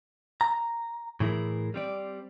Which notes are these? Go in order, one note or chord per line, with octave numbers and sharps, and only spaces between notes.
A#5
A2 E3 E4 G#4 A#4
G3 C4 D5